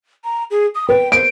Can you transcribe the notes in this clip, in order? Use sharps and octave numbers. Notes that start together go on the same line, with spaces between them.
A#5
G#4
D#6
B4 G5
C5 D7